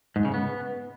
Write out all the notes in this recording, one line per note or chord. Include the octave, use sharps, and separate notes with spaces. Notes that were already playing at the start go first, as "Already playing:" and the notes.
G#2
C#3
B3